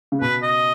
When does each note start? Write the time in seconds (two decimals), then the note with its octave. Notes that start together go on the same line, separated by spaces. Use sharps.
0.12 C#3
0.21 B2 B4
0.43 D#5